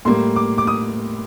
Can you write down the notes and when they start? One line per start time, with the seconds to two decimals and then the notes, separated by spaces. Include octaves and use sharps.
0.05 A2 G3 A#3 C6
0.36 D6
0.58 D6
0.67 D#6